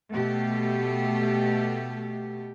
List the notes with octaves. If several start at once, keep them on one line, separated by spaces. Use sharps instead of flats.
B2 A3 G4